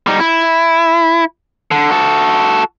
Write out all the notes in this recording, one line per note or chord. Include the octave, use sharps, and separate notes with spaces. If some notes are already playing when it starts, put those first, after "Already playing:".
G3 D#4
E4
D3
F#4 A4